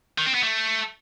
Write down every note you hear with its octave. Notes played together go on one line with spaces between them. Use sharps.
D#3
C4
B3
A3